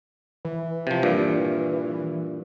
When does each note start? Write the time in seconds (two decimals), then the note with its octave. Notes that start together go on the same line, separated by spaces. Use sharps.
0.45 E3
0.87 C3 F3
1.03 G2 A#2